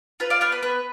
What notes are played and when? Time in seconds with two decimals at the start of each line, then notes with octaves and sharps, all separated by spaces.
0.20 F4 B4
0.30 D5 F5
0.41 B3 D5 F5
0.52 B4
0.63 B3 B4